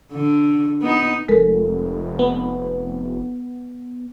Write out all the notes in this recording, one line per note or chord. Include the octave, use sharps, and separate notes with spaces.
D3
B3 D#4
F1 G#3 A4 A#4
B3